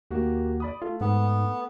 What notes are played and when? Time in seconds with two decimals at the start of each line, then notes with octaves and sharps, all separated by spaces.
0.11 D#2 A#3 F#4 G4
0.60 D5 B5 D#6
0.82 A3 F4
1.01 G#2 B3